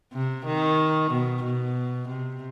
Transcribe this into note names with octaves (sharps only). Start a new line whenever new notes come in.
C3
D#3
B2
B2
C3